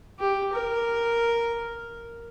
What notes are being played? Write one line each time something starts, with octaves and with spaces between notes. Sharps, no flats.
G4
A#4